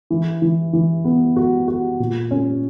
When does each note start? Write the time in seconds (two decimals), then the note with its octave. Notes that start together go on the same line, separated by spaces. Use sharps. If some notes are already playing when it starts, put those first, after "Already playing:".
0.10 E3
0.42 E3
0.73 E3
1.05 B3
1.36 F#4
1.68 F#4
2.00 A#2
2.31 C#4